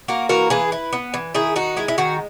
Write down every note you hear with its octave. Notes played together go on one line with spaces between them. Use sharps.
A#3 F#4 A#4
E3 F#4 A#4
E3 G#4 B4
E4
B3
E3
D#3 E4 G#4
D#4 F#4
G#3 E4
E4
D#3 F#4